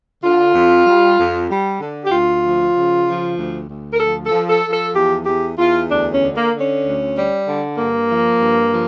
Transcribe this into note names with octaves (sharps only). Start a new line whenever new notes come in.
D3 F4
F2
G3
F2
G3
D3
G4
D2 F4
F3
C#3
F3
D2
D2
A#4
F3 A4
A4
F3
A4
F3
A4
E2 G4
E2 G4
E2 F4
D2 D4
C#4
D3
A#3
D3
C#4
D2
G3
D3
G2 A#3
F3
G2
F3